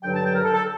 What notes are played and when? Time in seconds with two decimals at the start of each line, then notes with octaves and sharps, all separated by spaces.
0.02 G2 D3 F#3 G5
0.13 A5
0.23 G5
0.33 A#4
0.44 A4
0.54 A4